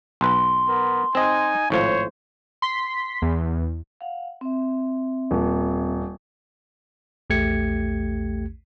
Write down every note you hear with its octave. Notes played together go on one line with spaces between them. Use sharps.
B1 B4 C6
B3 A#4
C4 D#4 D#5 G#5
G#1 A2 F3 C5 C#5
C6 B6
E2
F5 F#5
C4 E5
D#1
A#1 E2 A3 G4 G#6 C#7